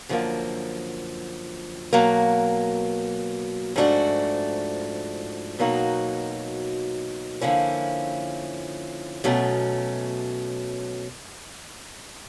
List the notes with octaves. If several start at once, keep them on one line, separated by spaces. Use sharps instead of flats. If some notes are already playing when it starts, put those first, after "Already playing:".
F#2 D3 F3 A#3
B2 F#3 A#3
G#2 F3 A3 D4 F#4
B2 F#3 A#3 D#4 F#4
D3 F3 A#3 C#4 E4
B2 F#3 A3 C#4